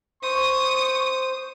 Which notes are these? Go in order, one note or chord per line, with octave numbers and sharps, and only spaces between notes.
C5 C#6 D#6